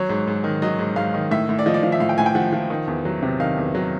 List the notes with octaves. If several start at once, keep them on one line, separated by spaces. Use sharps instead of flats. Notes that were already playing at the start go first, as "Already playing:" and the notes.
Already playing: F#3 C#5
G#2
G#2
D#3
F#3 D#5
G#2
G#2 F5
D#3
A2 E5
A2
D5
F3 D#5
D5
F3 F5
E5
A2 F5
G5
A2 G#5
G5
F3 F#5
F3
D#3
E2
F#3
C3
D#3 F5
E2
F#3